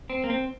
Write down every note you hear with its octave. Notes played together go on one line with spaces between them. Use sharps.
C4
A#3
C4